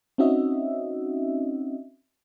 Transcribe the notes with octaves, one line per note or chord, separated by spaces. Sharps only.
C4 C#4 D#4 F#4 D#5 E5